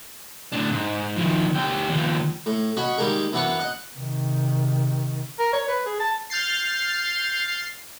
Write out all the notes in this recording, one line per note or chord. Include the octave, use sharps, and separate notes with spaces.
A2 D4
G#2
D#3 F3
D2 G4
D#2 F3
A2
C#4 F#4 D#5 F#5 B5
D#3 G3 G#3 A#3 G#4
F#2 E3 B3 D4 F#5 C#6
D#5 F#5
C3 D#3
A#4
C#5
B4
G#4
A5
F6 G6 A6 C7